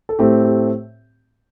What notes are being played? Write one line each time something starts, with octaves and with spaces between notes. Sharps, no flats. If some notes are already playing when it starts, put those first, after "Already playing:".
A4
A2 A3 C4 G4
G4